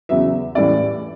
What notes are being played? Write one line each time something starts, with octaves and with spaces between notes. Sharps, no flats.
E2 C#3 F#3 B3 E5
A2 E3 G3 C#4 D5